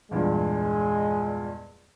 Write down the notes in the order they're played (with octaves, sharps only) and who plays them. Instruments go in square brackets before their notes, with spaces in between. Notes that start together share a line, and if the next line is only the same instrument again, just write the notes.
[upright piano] E2 G2 A#2 [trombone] G#3